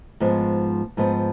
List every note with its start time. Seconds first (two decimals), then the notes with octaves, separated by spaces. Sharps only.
0.20 G#2 F3 G#3 B3
0.97 G#2 F3 G#3 B3